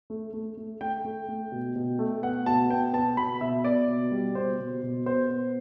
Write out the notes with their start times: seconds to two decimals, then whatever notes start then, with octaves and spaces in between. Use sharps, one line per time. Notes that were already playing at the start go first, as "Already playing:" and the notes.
0.10 A3
0.33 A3
0.57 A3
0.81 A3 G5
1.05 A3
1.28 A3
1.52 B2
1.76 B2
1.99 A3
2.23 B3 F#5
2.46 B2 A5
2.70 B3 G5
2.93 B3 A5
3.17 B2 B5
3.41 B2 E5
3.64 B3 D5
3.88 B2
4.12 G3
4.35 B2 C5
4.59 B2
4.83 B2
5.06 B3 C5
5.30 B3